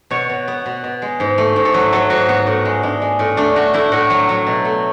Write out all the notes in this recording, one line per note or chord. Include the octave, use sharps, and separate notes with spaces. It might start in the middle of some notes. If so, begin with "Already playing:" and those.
B2 C#5
B2
B3
B2
B2
G#3
G#2
A3
G#2
A4
F#3 B4
F#3 A4
G#2 F#4
B3 F#4
A2
G#3
G#3 D4
G#3
A2
A3 D4
A3 F#4
A3 E4
A2 F#4
F#3
F#3
B2
A3